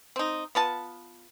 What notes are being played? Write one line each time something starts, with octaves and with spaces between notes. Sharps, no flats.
C4 D#4
B3 F4 A5